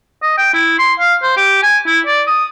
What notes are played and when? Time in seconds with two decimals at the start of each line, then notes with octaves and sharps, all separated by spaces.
0.23 D#5
0.38 G5
0.54 E4
0.79 C6
0.99 F5
1.22 C5
1.37 G4
1.63 G#5
1.87 E4
2.07 D5
2.27 D#6